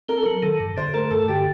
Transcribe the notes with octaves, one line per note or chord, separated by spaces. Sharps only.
C4 A#4
A4
F#3 A#4
D#3 A4
G2
D3 C5
A3 A#4
G2 A4
D3 G4